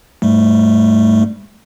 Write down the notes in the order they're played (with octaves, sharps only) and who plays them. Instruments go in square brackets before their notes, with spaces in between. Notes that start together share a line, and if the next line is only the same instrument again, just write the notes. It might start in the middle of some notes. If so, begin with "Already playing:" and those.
[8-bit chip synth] G#2 G3 A3